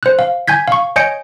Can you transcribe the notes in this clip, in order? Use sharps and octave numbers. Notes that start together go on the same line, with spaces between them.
C5 F#6
F5
G#5 G6 G#6 B6
F5 C#6
C#5 D#5 G#5 G6 C#7 D7